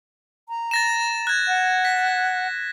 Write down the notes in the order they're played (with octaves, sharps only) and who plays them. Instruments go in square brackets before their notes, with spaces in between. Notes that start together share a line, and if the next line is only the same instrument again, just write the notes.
[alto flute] A#5
[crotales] A6 A#6 E7
F#6 G#6
[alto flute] F#5
[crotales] B6